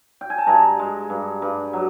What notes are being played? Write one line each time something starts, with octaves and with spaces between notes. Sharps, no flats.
G5
G#5
A5
G2 A#5
G#3
G2
G2
F#3